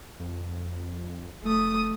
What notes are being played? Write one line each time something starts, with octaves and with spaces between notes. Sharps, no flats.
F2
F1 A3 D#6